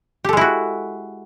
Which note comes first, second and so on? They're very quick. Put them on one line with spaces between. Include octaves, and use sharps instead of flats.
G4 A4 G#3 E4 F#4